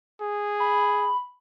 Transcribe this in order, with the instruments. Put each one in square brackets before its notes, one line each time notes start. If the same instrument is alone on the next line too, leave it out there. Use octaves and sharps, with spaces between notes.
[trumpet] G#4
[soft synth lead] B5